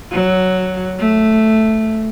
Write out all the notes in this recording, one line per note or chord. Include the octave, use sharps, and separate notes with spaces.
F#3
A3